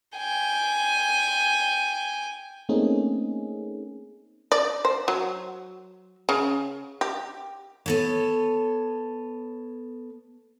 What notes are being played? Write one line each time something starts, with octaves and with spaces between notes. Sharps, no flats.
G5 G#5
A3 A#3 C4 C#4 D#4 G#4
D5
C5
F#3
C#3
G4
B3 A4 C#5